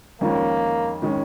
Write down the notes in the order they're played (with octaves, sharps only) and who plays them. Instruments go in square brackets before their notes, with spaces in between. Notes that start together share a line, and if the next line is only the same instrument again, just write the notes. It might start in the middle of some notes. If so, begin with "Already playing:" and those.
[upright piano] F2 D#3 G#3 C#4 [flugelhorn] A#3
[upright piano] D#3 G#3 C#4